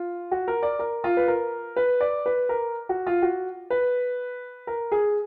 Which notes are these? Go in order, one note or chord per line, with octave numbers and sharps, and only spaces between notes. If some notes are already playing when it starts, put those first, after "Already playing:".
Already playing: F4
F#4
A#4
D5
A#4
F4
B4
A#4
B4
D5
B4
A#4
F#4
F4
F#4
B4
A#4
G#4